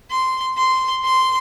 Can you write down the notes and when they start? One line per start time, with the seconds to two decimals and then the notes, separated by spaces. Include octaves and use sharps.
0.11 C6
0.57 C6
1.04 C6